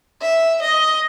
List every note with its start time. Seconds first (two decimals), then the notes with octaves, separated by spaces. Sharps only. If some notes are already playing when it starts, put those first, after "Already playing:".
0.21 E5
0.62 D#5